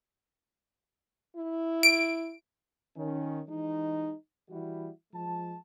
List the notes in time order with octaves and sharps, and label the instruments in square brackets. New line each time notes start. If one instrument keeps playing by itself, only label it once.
[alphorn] E4
[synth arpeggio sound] D7
[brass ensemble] D#3 C#4
E3 G#3 D#4
E3 G3 E4 F#4
F3 G#3 A5